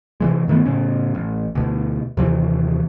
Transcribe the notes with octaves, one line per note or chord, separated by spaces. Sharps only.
C3 E3 G#3
G2 D#3 A3 B3
A2 C#3 C#4
A1
D2 B2
D#2 C3 E3